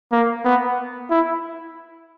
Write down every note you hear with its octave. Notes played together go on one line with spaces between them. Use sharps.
A#3
B3
E4